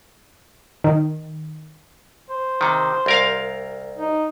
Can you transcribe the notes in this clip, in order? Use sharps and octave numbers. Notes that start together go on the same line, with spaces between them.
D#3
C5
C3 D#3
C2 A#4 F5
D#4